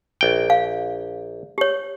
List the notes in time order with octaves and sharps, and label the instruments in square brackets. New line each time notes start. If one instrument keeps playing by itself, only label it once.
[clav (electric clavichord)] A#1 G5
[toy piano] F5
G4 C#5